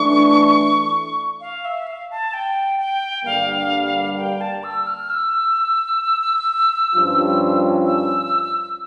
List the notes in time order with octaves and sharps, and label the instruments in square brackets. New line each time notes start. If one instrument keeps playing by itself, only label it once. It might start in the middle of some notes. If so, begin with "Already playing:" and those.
Already playing: [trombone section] E3 A3 D4 [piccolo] C#6
[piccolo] F5
E5
F5
A5
G5
G5
[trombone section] G2 D3 G3 A#3 D4 [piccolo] F5
[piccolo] G5
A5
E6
F6
E6
[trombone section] G2 F3 C#4 F4
[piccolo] E6